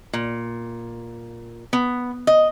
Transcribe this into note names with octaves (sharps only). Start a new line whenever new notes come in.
A#2
B3
D#5